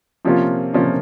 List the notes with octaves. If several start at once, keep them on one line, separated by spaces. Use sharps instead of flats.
C3 F3 A#3 C#4 F4
C3 F3 A#3 C#4 F4